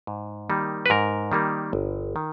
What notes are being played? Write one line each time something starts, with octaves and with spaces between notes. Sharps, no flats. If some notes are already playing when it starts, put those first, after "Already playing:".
G#2
D#3 G3 A#3 D#4
B4
G#2 A#4
D#3 G3 A#3 D#4
G1
D#3